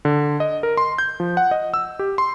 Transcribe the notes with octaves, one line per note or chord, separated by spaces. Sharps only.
D3
D#5
A#4
C6
G6
F3
F#5
D#5
E6
G4
C6